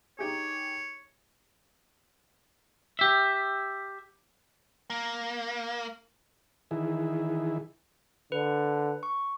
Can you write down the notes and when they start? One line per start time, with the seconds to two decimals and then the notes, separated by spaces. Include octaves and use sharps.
0.19 D#4 G4 G#4 C#5
2.99 G4 E5
4.90 A#3
6.71 D#3 E3 E4 G#4
8.32 D3 B4
9.03 C#6